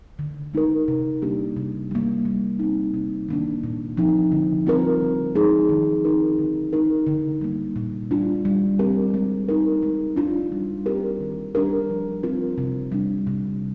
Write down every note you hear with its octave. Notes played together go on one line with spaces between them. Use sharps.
D3
G#3 D#4 A#4
C3
G3 A#3 D4 G4
C3
G3 A#3
G3
C4 D#4
C3
D#3 A#3 D4
A#2
F3 C4 D#4
D3
G3 C4 F4 A#4
D3
F3 G#3 D#4 G#4
D#3
G#3 C4 D#4 A#4
D3
G#3 D#4 A#4
D3
G3 A#3
A#2
G3 D4 F4
G3
C4 G4 A#4
G#3
D#4 A#4
G#3
D4 F4
G3
C4 G4 A#4
D#3
G3 D4 G4 A#4
F3
C4 F4 A#4
C3
G3 D4
C3